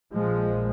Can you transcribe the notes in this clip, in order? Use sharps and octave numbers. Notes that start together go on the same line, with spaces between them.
A#1 A#2 F3 G#3